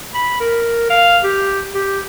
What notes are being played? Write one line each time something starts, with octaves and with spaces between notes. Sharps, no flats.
B5
A#4
F5
G4
G4